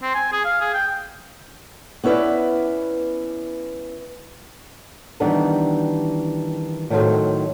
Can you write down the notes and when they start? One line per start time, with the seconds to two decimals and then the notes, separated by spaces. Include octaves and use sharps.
0.03 C4
0.15 G#5
0.32 G#4
0.45 F5
0.61 G#4
0.74 G5
2.04 B3 C#4 E4 B4 D5
5.20 D#3 E3 G3 B3 D4 D#4
6.90 A2 D#3 F#3 A3 C4